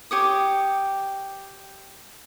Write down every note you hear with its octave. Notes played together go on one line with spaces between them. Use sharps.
G4 C#5 D#6